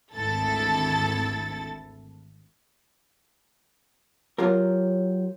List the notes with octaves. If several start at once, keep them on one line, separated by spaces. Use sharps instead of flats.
G#1 D2 E4 A4 A6
F#3 F4 G4 A#4